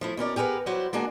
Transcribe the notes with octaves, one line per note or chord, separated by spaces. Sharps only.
F3 A3 E4
B2 C#4 A#4 D5
G4 G#4 A#4 B4 F#5
F#3 G3 E4 F#4 C5
G#3 A#3 D4 F#4 G#4